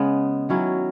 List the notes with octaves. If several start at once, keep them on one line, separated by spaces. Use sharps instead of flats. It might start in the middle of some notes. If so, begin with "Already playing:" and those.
Already playing: C#3 G#3 B3
D#3 F#3 C#4 E4